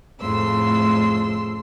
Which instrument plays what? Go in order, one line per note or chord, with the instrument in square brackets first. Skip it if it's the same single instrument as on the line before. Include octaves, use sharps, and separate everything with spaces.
[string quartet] F2 A2 C#3 C6 E6